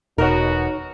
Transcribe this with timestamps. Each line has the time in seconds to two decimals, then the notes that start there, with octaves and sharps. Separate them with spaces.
0.18 E1 B2 D#4 F#4 A#4 C#5